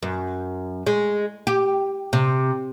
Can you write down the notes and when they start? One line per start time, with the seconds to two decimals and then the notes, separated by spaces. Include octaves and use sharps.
0.03 F#2
0.86 G#3
1.47 G4
2.13 C3